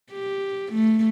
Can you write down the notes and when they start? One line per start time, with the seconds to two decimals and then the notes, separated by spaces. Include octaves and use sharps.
0.12 G4
0.73 A3